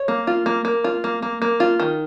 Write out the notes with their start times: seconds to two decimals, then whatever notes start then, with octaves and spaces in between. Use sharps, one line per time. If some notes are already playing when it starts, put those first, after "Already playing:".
Already playing: C#5
0.08 A#3
0.27 F4
0.46 A#3
0.65 A#3
0.84 F4
1.04 A#3
1.22 A#3
1.42 A#3
1.60 F4
1.80 D#3